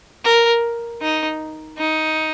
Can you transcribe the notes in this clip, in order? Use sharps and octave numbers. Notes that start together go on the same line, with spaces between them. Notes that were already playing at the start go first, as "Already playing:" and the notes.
A#4
D#4
D#4